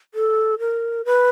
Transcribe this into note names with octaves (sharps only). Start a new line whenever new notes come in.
A4
A#4
B4